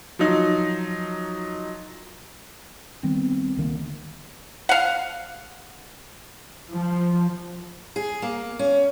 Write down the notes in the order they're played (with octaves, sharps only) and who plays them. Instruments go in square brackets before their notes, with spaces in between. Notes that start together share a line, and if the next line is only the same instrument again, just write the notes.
[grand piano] F3 F#3 D#4
[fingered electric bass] D#3 G3 B3 C4
D2 D#3 A#3
[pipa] F5 F#5
[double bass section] F3
[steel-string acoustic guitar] G#4
A#3
C#4